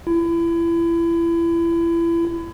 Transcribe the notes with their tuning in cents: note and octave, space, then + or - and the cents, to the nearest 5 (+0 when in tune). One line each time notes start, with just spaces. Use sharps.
E4 +30